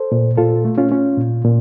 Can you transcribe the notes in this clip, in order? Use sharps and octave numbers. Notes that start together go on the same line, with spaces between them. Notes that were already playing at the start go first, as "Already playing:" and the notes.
Already playing: A4 C5
A#2
A#2 F4 A4
A3
C#4 F4
C#4
A#2
A#2